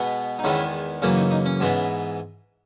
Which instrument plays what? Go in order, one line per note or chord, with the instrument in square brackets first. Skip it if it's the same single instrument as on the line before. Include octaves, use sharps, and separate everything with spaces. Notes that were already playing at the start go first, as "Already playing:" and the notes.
Already playing: [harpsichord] B2 G#3 B3
D#4
E2 D#3 G#3 B3 C#4 E4
F#2 C#3 E3 A#3 C#4
D#4
D#4
C#4
G#2 E3 G#3 B3